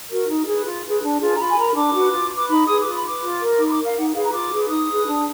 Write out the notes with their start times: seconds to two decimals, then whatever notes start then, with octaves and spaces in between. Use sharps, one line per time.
0.09 F#4 A#4
0.28 D#4
0.46 G#4 B4
0.64 F4
0.83 G#4 B4
1.02 D4
1.20 F4 G#4 B4
1.34 A#5
1.38 F4 B5
1.48 G#5
1.57 A#4 A#5
1.66 B5
1.74 D4 D6
1.94 F#4 B4
2.11 F4
2.30 B4
2.36 D6
2.49 D#4 B5
2.67 G#4 B4 D#6
2.80 D6
2.86 F4
2.94 B5
3.04 B4 D6
3.22 F4
3.41 A#4
3.59 D#4 D6
3.67 B5
3.71 D6
3.77 A#4
3.84 F5
3.96 D#4 F#5
4.15 G#4 B4 F5
4.24 A#5
4.32 F4 D6
4.52 G#4 B4
4.69 D#4 D#6
4.89 G#4 B4
5.07 D4